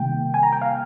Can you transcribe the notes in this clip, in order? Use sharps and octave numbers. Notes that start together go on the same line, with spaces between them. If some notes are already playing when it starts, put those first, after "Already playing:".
Already playing: C3 D#3 G3 A#3 G5
G#5
A#5
G5
F5